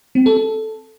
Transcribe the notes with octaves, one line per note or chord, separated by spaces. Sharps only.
C4
A4
A4